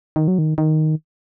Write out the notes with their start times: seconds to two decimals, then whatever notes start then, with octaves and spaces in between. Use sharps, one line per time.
0.16 D#3
0.28 F#3
0.39 D#3
0.58 D#3